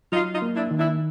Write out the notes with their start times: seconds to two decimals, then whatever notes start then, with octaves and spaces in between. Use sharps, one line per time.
0.12 F#3 D#4 F4
0.34 D#4 F4
0.42 A#3
0.56 D4 E4
0.71 D#3
0.78 D4 E4